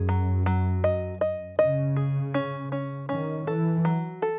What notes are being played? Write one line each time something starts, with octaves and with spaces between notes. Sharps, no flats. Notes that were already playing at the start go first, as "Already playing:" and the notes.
Already playing: F#2 G#4
F#3
F#3
D#5
D#5
C#3 D#5
G#4
C#4
C#4
D#3 C#4
E3 A4
F#3
A4